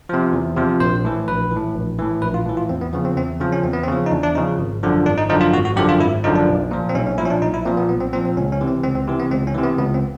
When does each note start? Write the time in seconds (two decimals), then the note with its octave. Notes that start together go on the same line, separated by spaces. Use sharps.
0.09 C3 F3
0.33 E2
0.57 C3 F3
0.80 A#1 C5
1.04 A2 E3
1.28 A#1 B4
1.51 E3
1.56 A2
1.74 A#1
1.99 A2 E3
2.22 A#1 B4
2.34 F4
2.45 A2 E3
2.57 F4
2.69 E2 C4
2.81 B3
2.93 C#3 F3 B3
3.05 C4
3.17 E2 C4
3.40 C#3 F3 C4
3.52 C#4
3.63 E2 C4
3.73 B3
3.83 C4
3.88 C#3 F3
4.06 D#4
4.12 E2 D4
4.23 D4
4.35 F3 D#4
4.38 C#3
4.59 G#1
4.83 F#2 D3 F3
5.06 G#1 D4
5.18 D#4
5.29 F#2 D3 F3 D#4
5.41 F4
5.53 G#1 F#4
5.65 F#4
5.76 F#2 D3 F3 G4
5.89 F4
6.00 G#1 E4
6.24 F#2 D3 F3 D#4
6.35 D4
6.48 B1
6.71 A#2 F3
6.89 C4
6.95 B1 C#4
7.07 C#4
7.18 A#2 F3 E4
7.25 C#4
7.30 D4
7.42 B1 D#4
7.54 E4
7.66 A#2 F3 C4
7.77 B3
7.89 B1 B3
8.01 C4
8.13 A#2 F3 C4
8.25 C4
8.37 C#2 C#4
8.52 C#4
8.61 C3 E3
8.68 C4
8.83 C#2 C4
8.95 C4
9.07 C3 E3
9.19 B3
9.31 C#2 C4
9.47 C#4
9.55 C3 E3
9.63 B3
9.78 C#2 B3
9.94 C4